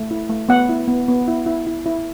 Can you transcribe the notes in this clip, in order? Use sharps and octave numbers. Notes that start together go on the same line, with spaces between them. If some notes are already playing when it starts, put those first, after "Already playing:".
Already playing: A3
E4
A3
B3 F#5
E4
B3
B3
E4
E4
E4
E4